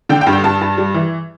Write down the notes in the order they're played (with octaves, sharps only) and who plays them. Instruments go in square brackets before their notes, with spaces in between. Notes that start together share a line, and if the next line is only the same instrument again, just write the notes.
[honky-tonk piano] D3 G5
G5
G2
G5
G2 A5
G2
G3
E3